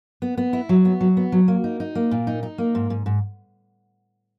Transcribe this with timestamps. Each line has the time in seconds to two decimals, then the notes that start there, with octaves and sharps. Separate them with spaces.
0.22 B3
0.38 B3
0.53 E4
0.69 F#3
0.85 B3
1.01 F#3
1.17 B3
1.32 F#3
1.48 A#3
1.64 D#4
1.80 D#4
1.95 A#3
2.11 A#2
2.27 D#4
2.43 D#4
2.58 A#3
2.75 G#2
2.90 G#2
3.06 G#2